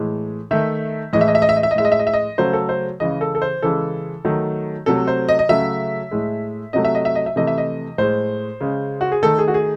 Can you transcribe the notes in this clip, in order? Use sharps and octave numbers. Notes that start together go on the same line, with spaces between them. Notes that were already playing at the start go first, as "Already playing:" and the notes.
Already playing: A2 E3 G#3
D#3 A3 E5
A2 E3 G#3 D#5
E5
D#5
E5
D#5
E5
D#5
E5
D#5
A2 G#3 E5
D#5
E5
D#5
E5
D#5
C#3 F#3 A3 C5
A4
C5
C#3 E3 G#3 D#5
A4
A4
C5
C#3 E3 G#3 A4
D#3 F#3 A3
C3 F#3 A3 A4
C5
D#5
D#5
C#3 F#3 A3 E5
A2 G#3
C3 F#3 A3 D#5
E5
D#5
E5
D#5
E5
C3 E3 A3 D#5
E5
D#5
A2 G#3 C5
C#3 G#3
F#4
G#4
D#3 A3 A4
G#4
F#4
G#4